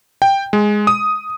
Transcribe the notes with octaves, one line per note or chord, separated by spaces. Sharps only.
G5
G#3
D#6